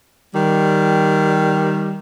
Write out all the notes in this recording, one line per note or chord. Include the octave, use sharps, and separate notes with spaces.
D#3 G3